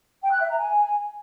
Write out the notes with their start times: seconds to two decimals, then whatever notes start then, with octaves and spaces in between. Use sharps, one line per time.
0.22 G5
0.31 F#6
0.40 E5
0.50 A#5
0.59 G#5